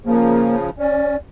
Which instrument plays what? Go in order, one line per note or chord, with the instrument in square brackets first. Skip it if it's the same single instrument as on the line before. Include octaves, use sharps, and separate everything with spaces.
[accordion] C#3 F3 [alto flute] A#3
[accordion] C#4 [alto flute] D5